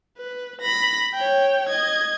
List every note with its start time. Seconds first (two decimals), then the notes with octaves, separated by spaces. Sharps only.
0.18 B4
0.62 B5 A#6
1.14 C#5 G5
1.69 D#5 G#6